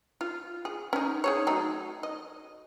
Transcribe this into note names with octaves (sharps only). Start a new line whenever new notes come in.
F4
G#4
C#4 D#4
D#4 G#4 C#5
F#3 A3 D#4
D#5